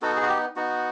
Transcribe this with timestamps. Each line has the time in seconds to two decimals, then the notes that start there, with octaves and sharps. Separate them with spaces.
0.02 B3 D#4 F#4 A4
0.16 G#4
0.23 F#4
0.29 G4
0.56 B3 D#4 F#4